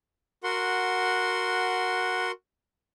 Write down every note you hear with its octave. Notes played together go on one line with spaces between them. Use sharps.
F#4 A#4 F#5 C6